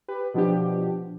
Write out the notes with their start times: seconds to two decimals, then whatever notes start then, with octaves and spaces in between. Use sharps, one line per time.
0.08 G4 B4
0.34 B2 F3 B3 D4 G4